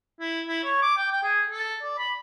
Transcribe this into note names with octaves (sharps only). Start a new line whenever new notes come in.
E4
E4
C#5
D6
G5
G5
G#4
A4
D5
B5